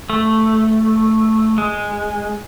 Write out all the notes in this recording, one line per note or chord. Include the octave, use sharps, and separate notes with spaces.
A3
G#3